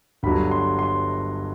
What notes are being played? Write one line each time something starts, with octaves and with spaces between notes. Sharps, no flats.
G1 G2 F#3 B5
C6
C6